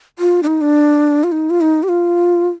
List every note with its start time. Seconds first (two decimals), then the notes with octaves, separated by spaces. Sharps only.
0.19 F4
0.43 D4
0.47 D#4
0.61 D4
1.24 F4
1.32 D#4
1.50 F4
1.61 D#4
1.83 G4
1.89 F4